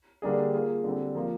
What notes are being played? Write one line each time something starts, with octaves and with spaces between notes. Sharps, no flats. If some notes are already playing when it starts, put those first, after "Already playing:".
D3 G3 A#3 D4 G#4
A#3 F4 G#4
D3 G3 C4
F3 A#3 F4